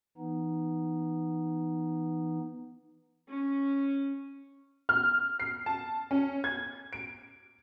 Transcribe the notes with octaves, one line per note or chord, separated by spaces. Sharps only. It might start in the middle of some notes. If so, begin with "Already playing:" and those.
E3 B3 D#4
C#4
F6
C7
A5
C#4
G#6
D7